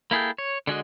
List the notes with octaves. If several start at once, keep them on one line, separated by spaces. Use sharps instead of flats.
A#3 E4 G#4 A4 G5
C#5
D3 G#3 F#4 D#5